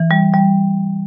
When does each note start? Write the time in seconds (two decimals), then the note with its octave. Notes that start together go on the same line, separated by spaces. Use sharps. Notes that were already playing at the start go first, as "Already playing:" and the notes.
Already playing: E3
0.11 G3
0.34 G3